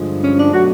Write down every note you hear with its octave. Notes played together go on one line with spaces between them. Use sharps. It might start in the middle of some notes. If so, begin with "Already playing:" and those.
Already playing: G2 D3 F3 G#3
C#4
D4
B2 F#3 A3 F#4